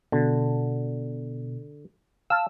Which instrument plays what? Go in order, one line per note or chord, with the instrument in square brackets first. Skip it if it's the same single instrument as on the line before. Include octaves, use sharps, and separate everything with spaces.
[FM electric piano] B2 [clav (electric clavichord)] D3
[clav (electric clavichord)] F5 A5 [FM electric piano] E6